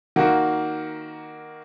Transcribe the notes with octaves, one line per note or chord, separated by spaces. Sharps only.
D#3 A#3 F#4